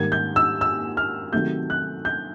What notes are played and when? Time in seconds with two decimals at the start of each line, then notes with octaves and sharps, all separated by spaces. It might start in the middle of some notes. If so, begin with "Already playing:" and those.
Already playing: G#2 D#3 G3 A#3 G#6
0.12 G6
0.36 E6
0.61 E6
0.97 F6
1.33 C3 D#3 F#3 A3 G6
1.70 F#6
2.05 G6